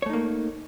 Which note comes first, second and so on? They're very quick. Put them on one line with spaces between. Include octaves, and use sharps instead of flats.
C#5 A3 D#4 A#3